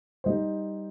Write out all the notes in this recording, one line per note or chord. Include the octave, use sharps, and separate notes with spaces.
G3 D#4 C5